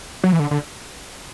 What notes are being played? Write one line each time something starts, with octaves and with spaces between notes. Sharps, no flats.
F#3
E3
D3
D3